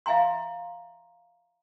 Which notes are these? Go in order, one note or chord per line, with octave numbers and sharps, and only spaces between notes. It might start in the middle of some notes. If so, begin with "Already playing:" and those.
E5 F5 G#5 A#5 C6